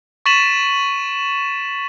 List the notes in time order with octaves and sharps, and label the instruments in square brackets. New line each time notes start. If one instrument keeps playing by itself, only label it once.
[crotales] C#6 A6 B6 D#7 E7 F#7